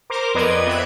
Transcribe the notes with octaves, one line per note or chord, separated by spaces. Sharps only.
A#4 C5 A#5 D6
F2 B3 B4 D5 D#5 G#6
B3 C4 E5 F#6 G#6